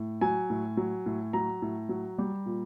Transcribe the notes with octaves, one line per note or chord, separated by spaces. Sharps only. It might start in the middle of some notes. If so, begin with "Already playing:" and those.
Already playing: A2
F#3 G#5
A2
F#3
A2
F#3 A#5
A2
F#3
G3
A#2